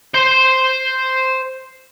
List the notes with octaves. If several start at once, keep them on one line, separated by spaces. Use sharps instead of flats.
C5 C6